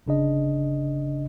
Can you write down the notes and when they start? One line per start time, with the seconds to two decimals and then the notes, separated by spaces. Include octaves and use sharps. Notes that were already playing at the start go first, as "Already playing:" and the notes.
0.07 G1 C#3 D4 D#5